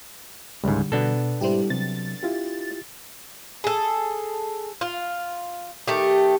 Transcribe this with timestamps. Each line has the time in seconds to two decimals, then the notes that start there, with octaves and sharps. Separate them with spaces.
0.64 C#2 G#2 D3 G3
0.92 B2 B3 D4 A4
1.41 G#2 G3 E4 G4 C5
1.70 C3 F#3 A6
2.23 E4 F4 G4
3.64 G#4 A4
4.81 F4
5.88 D#3 A3 G4